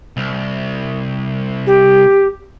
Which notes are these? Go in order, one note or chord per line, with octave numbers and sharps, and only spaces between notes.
C2
G4